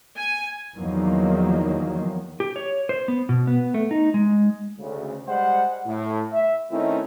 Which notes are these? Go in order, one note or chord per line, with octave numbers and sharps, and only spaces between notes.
G#5
E2 D#3 F3 F#3 A#3
G4
C#5
C5
B3
B2
B3
A3
D#4
G#3
D2 C#3
G3 G#3 C5 F#5
A2
E5
D#3 A3 C4 C#4 D#4 E4